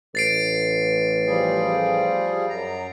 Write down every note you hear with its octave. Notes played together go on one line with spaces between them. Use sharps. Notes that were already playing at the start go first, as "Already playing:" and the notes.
A1 A6 C7 D7
F3 G3 G#4
F#2 A#5